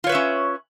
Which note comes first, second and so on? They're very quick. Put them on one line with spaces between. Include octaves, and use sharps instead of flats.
F4 C#5 B4 E5 C#4